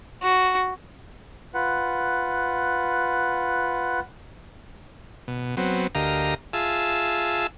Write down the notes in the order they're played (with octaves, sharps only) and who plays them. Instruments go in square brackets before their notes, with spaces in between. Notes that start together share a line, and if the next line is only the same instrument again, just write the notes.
[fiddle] F#4
[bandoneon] F4 B4 F#5
[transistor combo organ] B2
F#3 B3 C4
D2 G4 A#4 D#5 F5 A#5
F4 G#4 E5 A5 E6